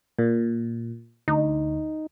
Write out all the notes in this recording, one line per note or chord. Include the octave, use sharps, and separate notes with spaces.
A#2
D2 D#4